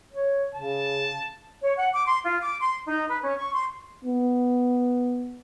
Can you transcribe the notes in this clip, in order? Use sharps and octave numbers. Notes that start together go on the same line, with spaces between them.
C#5
C#3 A5
C#5
F#5
D6
C6
F4
D6
C6
D#4
B4
C#4
C#6
C6
B3